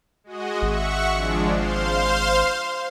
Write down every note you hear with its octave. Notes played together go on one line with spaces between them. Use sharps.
G#3 F#4 D#5
G#1 E5 F#5 C#6
F3 G#3 D4
C5 F5 C6